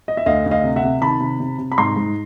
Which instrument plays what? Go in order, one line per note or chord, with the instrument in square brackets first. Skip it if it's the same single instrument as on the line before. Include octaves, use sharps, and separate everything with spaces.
[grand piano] D#5
E5
D2 D#5 F5
D2
D#5 F5
C3
E5 F#5
C3
D#3 A5 B5
C3
C3
C3
B5
G#2 A#5 C6
G#2